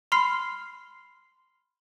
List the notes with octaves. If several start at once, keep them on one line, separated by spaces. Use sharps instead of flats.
B5 C6 F6 C7